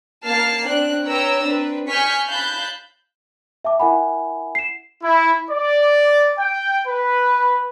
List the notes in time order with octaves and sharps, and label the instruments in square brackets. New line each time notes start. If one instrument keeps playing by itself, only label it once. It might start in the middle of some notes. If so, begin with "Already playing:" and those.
[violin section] A#3 A5 F6 C7
C4 D4 F#6
B4 C#5 G5 A#5 E6
C4 D4 B4
G#5 C#6 F6 G6 B6 C#7
F5 A5 B5 F#6 G6
[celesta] E5 G5 A5 D6
E4 A#4 E5 F#5 G#5 B5
C7 E7
[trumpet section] E4
D5
G5
B4